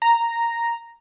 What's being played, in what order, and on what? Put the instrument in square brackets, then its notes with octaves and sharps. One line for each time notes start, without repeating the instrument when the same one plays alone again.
[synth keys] A#5